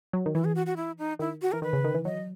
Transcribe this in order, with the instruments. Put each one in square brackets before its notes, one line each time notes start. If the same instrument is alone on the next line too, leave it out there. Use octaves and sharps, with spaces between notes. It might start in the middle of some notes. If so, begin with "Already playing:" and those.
[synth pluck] F#3
D#3
[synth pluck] E3 [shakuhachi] E4
[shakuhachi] G#4
F#4
F#4
E4
D#4
[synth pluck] D#3 [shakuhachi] E4
[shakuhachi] F#4
[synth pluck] E3 [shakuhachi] A#4
[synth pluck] D#3 [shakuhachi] B4
[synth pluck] C#3
D#3
E3
[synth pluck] F#3 [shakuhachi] D#5